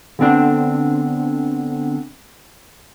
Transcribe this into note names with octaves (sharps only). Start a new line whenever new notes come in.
D3 B3 C4 D4